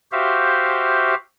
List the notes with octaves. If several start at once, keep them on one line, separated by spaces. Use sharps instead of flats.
F#4 G4 C5 E5 F5